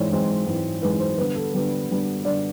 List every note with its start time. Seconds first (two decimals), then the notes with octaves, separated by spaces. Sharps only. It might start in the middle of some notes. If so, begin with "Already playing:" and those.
Already playing: G#2 E3 G#3 C4 C#5 D5
0.11 G#2 E3 G#3 C4
0.46 G#2 E3 G#3 C4
0.82 G#2 E3 G#3 C4 B4
1.00 C5
1.18 D3 G3 B3 B4
1.35 A4
1.54 D3 G3 B3
1.89 D3 G3 B3
2.25 D3 G3 B3 D5